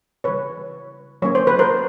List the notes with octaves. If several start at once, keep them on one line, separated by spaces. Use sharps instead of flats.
C#3 E3 G3 B4 C#5
F#3 A#3 C#4 C#5
C5
B4
A#4 C5